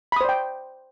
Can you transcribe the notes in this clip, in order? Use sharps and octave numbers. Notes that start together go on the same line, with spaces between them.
C5 D5 G5 B5 D#6